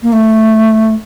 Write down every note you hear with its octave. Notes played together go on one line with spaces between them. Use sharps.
A#3
A3